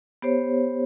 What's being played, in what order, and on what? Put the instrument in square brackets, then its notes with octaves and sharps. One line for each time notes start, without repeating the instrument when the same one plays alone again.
[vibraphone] B3 G4 C5 C#5